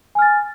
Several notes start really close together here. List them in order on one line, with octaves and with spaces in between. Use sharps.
G#5 F6 A6